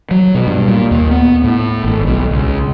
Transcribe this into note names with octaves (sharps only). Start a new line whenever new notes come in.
F#3
B2
G2
A#2
D#2
B3
A2
G#1
B1
C#2